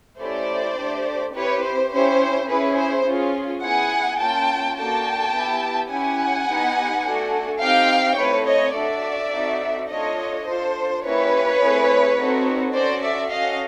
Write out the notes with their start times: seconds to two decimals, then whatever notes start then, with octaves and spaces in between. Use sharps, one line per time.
0.20 A3 C#4 E4 G4 C5 D5
0.77 A3 D4 G4
1.34 C4 E4 G4 B4 C#5
1.63 C5
1.91 C#4 E4 G4 C5
2.48 C#4 E4 G#4 B4
2.77 C5
3.05 C#4 F4 G#4
3.62 B3 E4 G#4 F#5 G#5
4.20 A#3 C#4 F4 G5 A5
4.76 A#3 D4 F#4 A4 G5 A5
5.33 B3 E4 G4
5.91 C#4 E4 G4 F#5 G#5
6.48 B3 D#4 G4
7.05 A3 D4 F#4 A4
7.61 C4 D#4 G4 F5 G5
8.18 A3 C4 E4 B4 C#5
8.47 C#5 D#5
8.75 D4 F#4 A4 D5 E5
9.32 C4 D#4 F#4 A4
9.90 A3 D4 F4 A4 C#5 D#5
10.46 D4 F4 A4 C5
11.03 A#3 C#4 E4 G4 B4 C#5
11.60 A3 C4 E4 G#4
12.18 C4 D#4 F#4 A4
12.74 C#4 F#4 A4 C5 D5
13.03 D5 E5
13.32 C#4 F#4 A4 D#5 F5